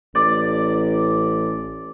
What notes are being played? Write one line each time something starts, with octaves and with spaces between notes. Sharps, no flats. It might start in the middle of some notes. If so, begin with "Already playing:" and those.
A1 D5